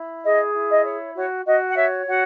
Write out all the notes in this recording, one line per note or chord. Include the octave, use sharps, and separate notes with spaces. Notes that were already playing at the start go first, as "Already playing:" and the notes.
Already playing: E4
G#4 D#5
E4
D#5
C#5
F#4 C#5
F#4 D#5
F#5
C#5 E5
F#4 F#5